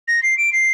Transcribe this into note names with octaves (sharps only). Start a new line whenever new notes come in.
A#6
C7
D7
C7